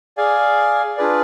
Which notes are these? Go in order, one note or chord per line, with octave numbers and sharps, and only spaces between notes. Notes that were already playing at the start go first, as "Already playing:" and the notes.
G#4 D5 F5 G#5
D4 F4 G#4 B4 D5